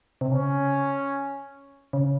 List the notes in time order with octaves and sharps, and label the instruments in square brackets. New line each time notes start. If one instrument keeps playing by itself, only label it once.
[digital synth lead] C3
[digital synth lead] C#3 [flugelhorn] C#4
[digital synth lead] C#3